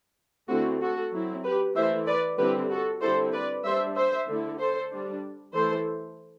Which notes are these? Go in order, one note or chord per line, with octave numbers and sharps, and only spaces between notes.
D3 A3 C4 E4 F#4
F#4 A4
F#3 C4 E4
G4 B4
E3 A3 E4 C5 E5
B4 D5
D3 G3 C4 E4 G4 B4
F#4 A4
D3 G3 C4 E4 A4 C5
B4 D5
G3 D4 C5 E5
C5 E5
D3 A3 E4
A4 C5
G3 D4
E3 A3 E4 A4 C5